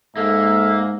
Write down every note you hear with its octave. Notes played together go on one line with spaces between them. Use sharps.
G#2 A#3 A4 E5